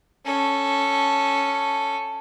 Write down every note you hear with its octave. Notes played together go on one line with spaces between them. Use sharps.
C#4 A4